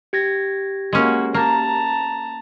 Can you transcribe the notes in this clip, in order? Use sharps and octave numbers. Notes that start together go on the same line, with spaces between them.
G4 G#6 A#6
G#3 A#3 C#4 F#4
A#3 A5 A#5